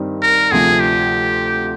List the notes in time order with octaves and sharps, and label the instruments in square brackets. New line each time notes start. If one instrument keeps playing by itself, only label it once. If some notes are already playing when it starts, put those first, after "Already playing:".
Already playing: [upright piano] G2 D#3 G3 C4 D#4
[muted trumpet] A#4
[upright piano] D2 C3 F3 [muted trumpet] G#4
[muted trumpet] G4